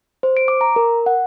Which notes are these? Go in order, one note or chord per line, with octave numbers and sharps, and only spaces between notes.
C5
D7
D6
A#5
A#4
F#5